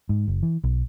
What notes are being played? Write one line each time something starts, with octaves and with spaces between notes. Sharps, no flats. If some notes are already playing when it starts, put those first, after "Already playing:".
G#2
F#1
E3
B1